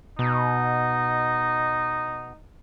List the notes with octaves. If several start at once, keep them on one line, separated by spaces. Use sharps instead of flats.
B2 D#4